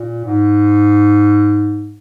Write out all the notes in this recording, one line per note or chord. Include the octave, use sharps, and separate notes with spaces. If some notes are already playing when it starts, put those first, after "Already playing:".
Already playing: A#2
G#2